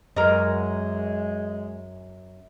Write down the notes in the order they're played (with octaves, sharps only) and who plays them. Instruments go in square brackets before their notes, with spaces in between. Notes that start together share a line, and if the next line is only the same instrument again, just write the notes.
[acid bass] F#2 [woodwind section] G#3 [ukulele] A#4 D#5